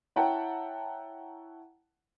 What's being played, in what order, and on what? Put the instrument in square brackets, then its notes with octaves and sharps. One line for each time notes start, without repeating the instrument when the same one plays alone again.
[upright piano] E4 C#5 F#5 G5 A5 A#5